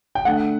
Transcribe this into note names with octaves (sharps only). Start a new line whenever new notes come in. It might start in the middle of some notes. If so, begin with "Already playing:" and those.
G5
D3 A3 D4 F#5